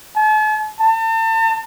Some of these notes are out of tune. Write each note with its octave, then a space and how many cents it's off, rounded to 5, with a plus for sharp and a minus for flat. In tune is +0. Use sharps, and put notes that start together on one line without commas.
A5 -45
A5 +40